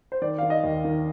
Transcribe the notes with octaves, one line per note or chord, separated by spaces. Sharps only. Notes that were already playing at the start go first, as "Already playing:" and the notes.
C5
D#3 D5
D#3 F5
D#5
D#2
D#3